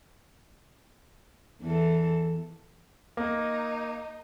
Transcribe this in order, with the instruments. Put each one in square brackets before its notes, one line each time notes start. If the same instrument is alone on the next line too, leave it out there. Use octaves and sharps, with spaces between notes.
[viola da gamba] E2 E3 A4
[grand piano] A#3 [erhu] D#4